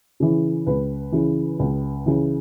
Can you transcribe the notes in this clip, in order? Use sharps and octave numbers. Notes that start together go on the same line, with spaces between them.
C#3 E3
C#2 B4
C#3 E3
C#2
C#3 E3